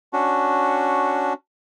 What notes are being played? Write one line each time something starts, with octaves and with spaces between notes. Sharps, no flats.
C#4 D4 F#4